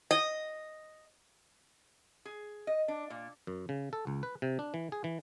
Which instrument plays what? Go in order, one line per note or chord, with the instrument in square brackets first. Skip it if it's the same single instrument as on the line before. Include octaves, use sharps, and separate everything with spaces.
[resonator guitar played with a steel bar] D#5
G#4
D#5
D4
A#2
[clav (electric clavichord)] F#2
C#3
A4
C#2
B4
C3
D4
E3
G#4
E3